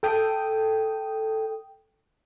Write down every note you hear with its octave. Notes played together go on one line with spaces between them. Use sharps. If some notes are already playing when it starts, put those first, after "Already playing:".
A4 G5 D#6